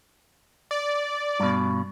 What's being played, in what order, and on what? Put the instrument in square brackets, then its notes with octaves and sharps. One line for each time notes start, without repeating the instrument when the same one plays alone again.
[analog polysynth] D5
[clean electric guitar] G2 B2